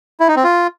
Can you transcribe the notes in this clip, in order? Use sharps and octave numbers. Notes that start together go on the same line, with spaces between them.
E4
D#4
C4
F4